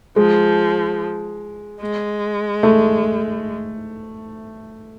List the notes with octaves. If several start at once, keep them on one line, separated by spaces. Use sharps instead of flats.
F3 G#3
G#3
A3